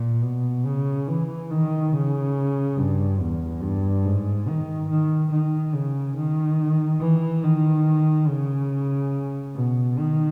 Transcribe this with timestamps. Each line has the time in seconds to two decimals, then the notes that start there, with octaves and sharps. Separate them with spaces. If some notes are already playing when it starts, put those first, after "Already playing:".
Already playing: A#2
0.23 B2
0.65 C#3
1.08 E3
1.51 D#3
1.92 C#3
2.77 G2
3.20 E2
3.62 G2
4.05 G#2
4.47 D#3
4.89 D#3
5.31 D#3
5.74 C#3
6.17 D#3
7.01 E3
7.43 D#3
8.28 C#3
9.55 B2
9.98 D#3